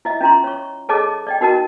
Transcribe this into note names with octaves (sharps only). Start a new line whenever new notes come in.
E4 D#5 E5
C#4 F4 A#5 C6
C#5 C#6
G#4 A4 C#5 D#5 A5 D6
D5 D#5 G5
D#4 F#4 A#4 D#5 A5